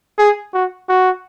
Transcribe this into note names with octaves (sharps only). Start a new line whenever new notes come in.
G#4
F#4
F#4